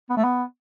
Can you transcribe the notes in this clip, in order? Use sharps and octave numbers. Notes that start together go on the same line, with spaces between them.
B3
A3
B3